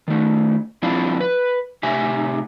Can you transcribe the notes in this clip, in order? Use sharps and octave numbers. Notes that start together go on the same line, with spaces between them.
D#3 A3
F3 C4 D4 E4 F5
B4
A2 C3 G4 E5 G#5